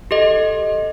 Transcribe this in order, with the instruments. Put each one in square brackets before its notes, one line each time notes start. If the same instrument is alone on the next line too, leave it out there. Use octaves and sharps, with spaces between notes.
[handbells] G4 A4 D#5